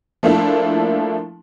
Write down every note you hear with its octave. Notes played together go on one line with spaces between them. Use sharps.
F3 A3 A#3 D4 E4